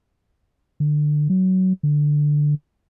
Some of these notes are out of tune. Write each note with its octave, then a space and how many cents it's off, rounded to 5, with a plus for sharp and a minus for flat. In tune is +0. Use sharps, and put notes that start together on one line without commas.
D3 +20
F#3 +15
D3 +5